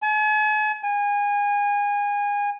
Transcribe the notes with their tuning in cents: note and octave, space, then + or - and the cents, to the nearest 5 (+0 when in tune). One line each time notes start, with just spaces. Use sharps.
G#5 +45
G#5 -25